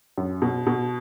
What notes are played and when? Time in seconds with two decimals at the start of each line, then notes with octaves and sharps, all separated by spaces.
0.18 F#2
0.42 B2
0.67 B2